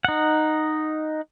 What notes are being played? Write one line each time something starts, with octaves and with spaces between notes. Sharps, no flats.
D#4 F#5